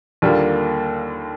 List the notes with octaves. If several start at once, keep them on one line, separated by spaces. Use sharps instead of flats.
D#2 D3 G3 A#3 F4